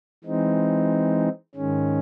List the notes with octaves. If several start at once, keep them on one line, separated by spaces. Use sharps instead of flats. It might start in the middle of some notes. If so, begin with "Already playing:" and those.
E3 G#3 C4 D#4
G#2 D#3 G#3 C#4